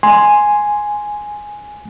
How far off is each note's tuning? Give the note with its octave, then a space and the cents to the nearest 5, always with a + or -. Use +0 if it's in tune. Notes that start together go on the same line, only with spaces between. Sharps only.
G#5 +0 C6 +0